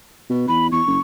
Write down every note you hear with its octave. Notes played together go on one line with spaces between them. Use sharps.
B2
E2 B5
E2 C#6
F#1